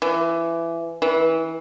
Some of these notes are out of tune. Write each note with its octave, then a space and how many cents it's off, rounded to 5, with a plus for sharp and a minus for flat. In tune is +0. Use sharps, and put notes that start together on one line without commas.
E3 +20
E3 -20